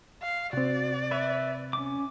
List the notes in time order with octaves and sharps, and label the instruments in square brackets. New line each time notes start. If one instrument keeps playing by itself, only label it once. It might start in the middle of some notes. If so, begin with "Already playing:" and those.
[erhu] F5
[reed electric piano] C3 C4 [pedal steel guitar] F#4 [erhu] D5
[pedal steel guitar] B4 E5
C#4 D6